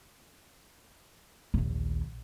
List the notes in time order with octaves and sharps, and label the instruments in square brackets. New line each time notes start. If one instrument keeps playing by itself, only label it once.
[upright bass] A#1 D#2